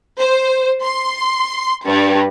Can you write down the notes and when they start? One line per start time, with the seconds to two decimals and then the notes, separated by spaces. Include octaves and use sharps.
0.20 C5
0.84 C6
1.86 G2